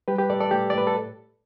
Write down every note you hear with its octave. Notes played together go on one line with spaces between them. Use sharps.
G3 G4 B4
G4 B4
A2 A4 D5
A4 D5
A2 G4
D5
A2 B4
A4